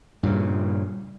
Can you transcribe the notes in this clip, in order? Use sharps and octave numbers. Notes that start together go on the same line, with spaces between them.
G2 A#2 C#3